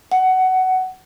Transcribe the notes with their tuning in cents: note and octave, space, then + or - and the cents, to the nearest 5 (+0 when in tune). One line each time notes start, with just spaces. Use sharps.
F#5 +15